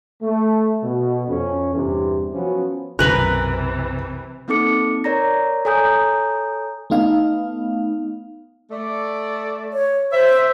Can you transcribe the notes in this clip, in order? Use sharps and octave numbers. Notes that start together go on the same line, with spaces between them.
A3
B2
F2 C#4
E2 G2 C3 E3
F3 F#3 B3 C#4
B1 F#2 C3 E3 A#4 B4 G#5 F#6
A#3 C4 D#4 A4 D6 C#7
A#4 C#5 D5 A#5 A#6
A4 C#5 G#5 A#5 D#6 G6
A3 B3 D#4 F5
A3 D5
C#5
C5 E5